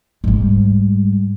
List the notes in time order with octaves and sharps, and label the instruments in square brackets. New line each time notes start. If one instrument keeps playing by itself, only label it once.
[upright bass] G#2 G3